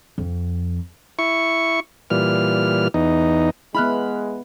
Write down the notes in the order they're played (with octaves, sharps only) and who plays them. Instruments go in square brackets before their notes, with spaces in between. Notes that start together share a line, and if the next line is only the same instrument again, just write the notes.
[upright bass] F2
[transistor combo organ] E4 C#6
A#2 E3 G3 F6
E2 D#4
[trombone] G#3 [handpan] B3 E4 [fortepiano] B5 F6 F#6